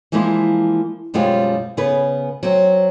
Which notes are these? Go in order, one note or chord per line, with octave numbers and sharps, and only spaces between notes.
E3 F3 G#3 A#3 E4
F#2 B2 G3 G#3 C4 F4
C#3 B3 G#4 B4
F#3 C4